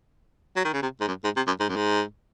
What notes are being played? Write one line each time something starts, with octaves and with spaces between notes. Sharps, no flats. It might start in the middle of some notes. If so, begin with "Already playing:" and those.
F#3
D#3
C#3
C3
G#2
F#2
G#2
C3
F#2
G#2
F#2
G#2